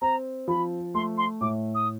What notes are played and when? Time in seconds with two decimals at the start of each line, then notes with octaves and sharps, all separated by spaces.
0.01 C4 A#5
0.48 F3 B5
0.94 A3 C6
1.18 C6
1.41 A2 D6
1.74 D#6